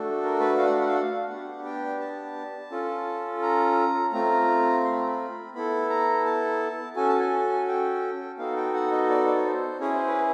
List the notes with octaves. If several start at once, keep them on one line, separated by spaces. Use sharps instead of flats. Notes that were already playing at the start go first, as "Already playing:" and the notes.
Already playing: A3 D4 F#4 A4
A#4
B4
F5
F#5
F5
F#5
F5
F#5
F5
B3 D4 G4 F#5
G5
A5
C#4 F4 A4
A#5
A3 C4 F4 A#5
C6
B5
A#5
B5
B3 E4 A4 B5
A#5
A5
C#4 F#4 A4 G#5
A5
G#5
G5
B3 D#4 F#4 A4 F5
G5
F#5
D#5
D5
D5
C#5
C5
C#4 E4 G#4 C#5
C5
B4